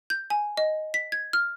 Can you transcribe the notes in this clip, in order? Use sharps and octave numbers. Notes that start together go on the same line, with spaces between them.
G6
G#5
D#5
B6
G#6
F6